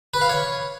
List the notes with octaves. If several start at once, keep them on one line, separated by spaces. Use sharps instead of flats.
B4
F5
C#5